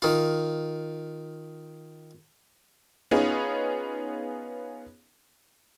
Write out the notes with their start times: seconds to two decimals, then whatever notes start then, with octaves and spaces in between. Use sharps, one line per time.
0.02 D#3 F4
3.11 B3 C#4 D#4 F4 G#4